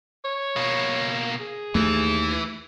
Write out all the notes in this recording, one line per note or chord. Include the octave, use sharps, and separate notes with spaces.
C#5
B2 A#3
G#4
D#2 E3 A3